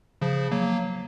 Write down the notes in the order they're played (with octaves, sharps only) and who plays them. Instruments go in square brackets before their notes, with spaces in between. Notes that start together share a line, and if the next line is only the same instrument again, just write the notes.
[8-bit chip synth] C#3 F3
F#3 A#3